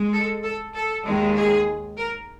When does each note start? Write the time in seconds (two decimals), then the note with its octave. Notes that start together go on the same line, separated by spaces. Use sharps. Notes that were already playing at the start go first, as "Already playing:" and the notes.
Already playing: G#3
0.13 A4
0.43 A4
0.74 A4
1.05 D#2 D#3 G#3
1.36 G#4
1.97 A#4